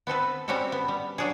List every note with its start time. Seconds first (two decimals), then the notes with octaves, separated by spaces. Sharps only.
0.07 B3 C4 A4 B4
0.48 G3 C4 C#4 F#4 G4 A4
0.72 B3
0.88 G3
1.18 F#3 D4 G#4